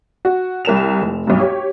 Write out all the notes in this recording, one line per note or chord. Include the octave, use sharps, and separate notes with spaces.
F#4
C2 A#4 E7 F7
F1
B1 G2
G4 C#5